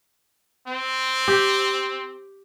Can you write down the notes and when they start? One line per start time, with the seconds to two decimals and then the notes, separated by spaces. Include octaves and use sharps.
0.67 C4
1.28 G4